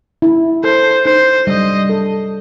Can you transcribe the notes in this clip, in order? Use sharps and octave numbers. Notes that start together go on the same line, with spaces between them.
E4
A4 C5
D#4 C5
G3 D#5
A4